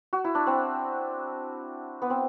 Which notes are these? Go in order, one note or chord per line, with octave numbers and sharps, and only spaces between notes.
F#4
E4
D4
C4
B3
C4